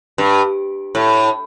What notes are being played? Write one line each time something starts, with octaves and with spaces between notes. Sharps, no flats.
G2
A2